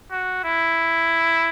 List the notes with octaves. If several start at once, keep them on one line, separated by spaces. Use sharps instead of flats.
F#4
E4